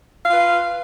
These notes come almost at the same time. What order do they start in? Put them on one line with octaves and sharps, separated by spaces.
F5 F4 B4